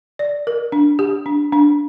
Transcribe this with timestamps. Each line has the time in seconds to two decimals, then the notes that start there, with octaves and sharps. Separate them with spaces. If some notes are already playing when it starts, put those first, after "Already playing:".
0.19 D5
0.47 A#4
0.72 D4
0.99 G4
1.26 D4
1.53 D4